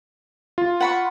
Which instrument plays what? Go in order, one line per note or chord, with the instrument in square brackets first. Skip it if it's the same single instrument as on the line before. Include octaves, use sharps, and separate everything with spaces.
[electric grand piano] F4
[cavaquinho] F#5 B5 C#6